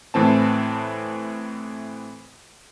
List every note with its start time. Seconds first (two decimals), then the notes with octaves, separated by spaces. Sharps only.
0.14 A2 E3 C4 A5